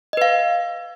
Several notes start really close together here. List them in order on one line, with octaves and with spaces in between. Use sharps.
D#5 B4 F5